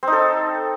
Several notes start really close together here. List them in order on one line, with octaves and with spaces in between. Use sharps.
C4 D#4 A4